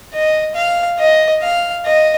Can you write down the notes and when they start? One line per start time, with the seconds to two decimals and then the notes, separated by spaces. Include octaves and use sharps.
0.14 D#5
0.56 F5
0.99 D#5
1.43 F5
1.86 D#5